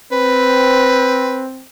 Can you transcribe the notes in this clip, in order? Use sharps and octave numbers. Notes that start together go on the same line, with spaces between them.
C4 B4